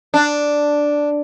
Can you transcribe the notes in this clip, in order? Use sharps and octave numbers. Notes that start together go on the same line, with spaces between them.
D4